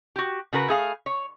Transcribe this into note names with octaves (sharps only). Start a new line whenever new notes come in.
F#4 G4
C#3 F#4 A#4 B4
A3 G#4 F5
C#5